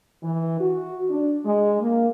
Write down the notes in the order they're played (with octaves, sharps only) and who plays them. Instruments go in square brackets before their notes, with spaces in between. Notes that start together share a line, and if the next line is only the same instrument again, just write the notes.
[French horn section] E3
F#4
D4
G#3
A#3